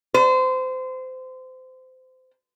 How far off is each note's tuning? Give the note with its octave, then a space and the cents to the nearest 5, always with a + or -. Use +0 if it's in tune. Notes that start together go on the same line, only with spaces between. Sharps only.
C5 -25